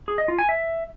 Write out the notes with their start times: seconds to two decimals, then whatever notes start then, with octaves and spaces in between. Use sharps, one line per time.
0.08 G#4
0.18 D#5
0.28 F4
0.39 G#5
0.49 E5